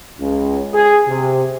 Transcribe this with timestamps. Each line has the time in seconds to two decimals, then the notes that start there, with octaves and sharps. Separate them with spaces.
0.18 C#2
0.74 G#4
1.06 C3